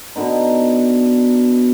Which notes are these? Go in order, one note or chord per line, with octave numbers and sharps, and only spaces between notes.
B2 D3 B3 D#4